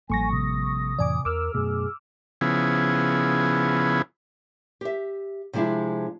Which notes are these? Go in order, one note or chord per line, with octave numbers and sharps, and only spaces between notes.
A1 F3 G3 A#3 G#5 C#6 A#6
C3 D#6
F2 A2 E3 D5 G#5 D6
E2 A#4 D6 E6 F6
F#2 B2 A3 G#4
C#3 F3 B3 E4 G#4
G4 E5
C3 F3 G#3 D4 E4